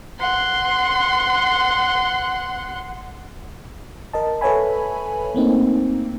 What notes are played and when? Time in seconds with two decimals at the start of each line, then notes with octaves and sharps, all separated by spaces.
0.20 F#5 C6
4.13 A#4 D#5 A5
4.41 A4 B4 C#5 E5 G#5 B5
5.35 A3 A#3 C4 D#4